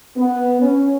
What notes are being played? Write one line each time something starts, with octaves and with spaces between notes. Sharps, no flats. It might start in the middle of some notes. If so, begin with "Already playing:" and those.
B3
C#4